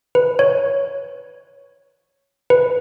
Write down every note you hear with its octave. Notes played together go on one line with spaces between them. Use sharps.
B4
C#5
B4